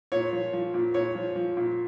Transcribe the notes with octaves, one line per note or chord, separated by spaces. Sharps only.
A#2 C#5
F3
F3
A#2
A#2 C#5
F3
F3
A#2